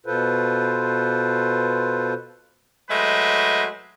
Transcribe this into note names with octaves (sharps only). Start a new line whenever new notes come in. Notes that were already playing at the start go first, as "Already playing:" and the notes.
B2 F4 A4 B4 C5
F#3 G#3 A3 B4 C5 D#5